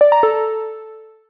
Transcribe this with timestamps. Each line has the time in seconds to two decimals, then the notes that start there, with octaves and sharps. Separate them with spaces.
0.01 D5
0.12 A#5
0.23 A4
0.34 A4